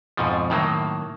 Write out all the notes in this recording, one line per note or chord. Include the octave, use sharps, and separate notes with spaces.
F2 G#2 B2 F3
A2 D#3 F#3 A#3